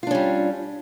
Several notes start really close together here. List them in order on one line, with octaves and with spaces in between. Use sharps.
F4 D4 C#4 G3